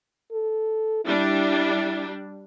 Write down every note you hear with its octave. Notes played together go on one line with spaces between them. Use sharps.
A4
G3 D4 E4